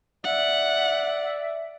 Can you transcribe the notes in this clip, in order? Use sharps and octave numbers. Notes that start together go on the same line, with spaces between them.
D5 E5 F#5